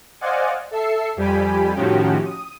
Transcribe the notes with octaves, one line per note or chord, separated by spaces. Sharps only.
C5 D5 D#5 F5 F#5 G#5
A4 E5 E6 C7 C#7
F2 G3 G4 G#5 B5
A2 D#3 F3 C#4 F#4 G4
D#6